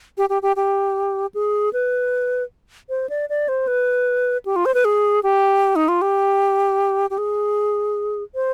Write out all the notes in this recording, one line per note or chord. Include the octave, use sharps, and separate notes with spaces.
G4
G4
G4
G4
G#4
B4
C5
D5
D5
C5
B4
G4
F4
C5
B4
G#4
G4
D#4
F4
G4
G4
G#4
C5